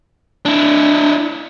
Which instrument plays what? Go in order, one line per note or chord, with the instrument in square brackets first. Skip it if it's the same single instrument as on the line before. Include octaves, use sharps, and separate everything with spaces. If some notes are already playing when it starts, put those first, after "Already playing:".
[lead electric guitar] D4 E4